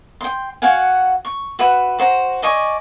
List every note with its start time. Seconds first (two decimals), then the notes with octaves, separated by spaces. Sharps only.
0.21 G5 C6
0.62 F#4 F5 F#5 G#5
1.25 C#6
1.59 F#4 B4 E5
1.99 F#4 C5 A#5
2.42 D5 D#5 G#5 C#6